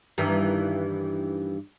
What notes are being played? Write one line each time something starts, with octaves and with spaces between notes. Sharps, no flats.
G2 D#3 E3